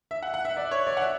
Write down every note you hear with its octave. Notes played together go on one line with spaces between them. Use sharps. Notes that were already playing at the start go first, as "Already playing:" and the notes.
E5
F#5
F#5
E5
D5
C#5
D5
F#5
E5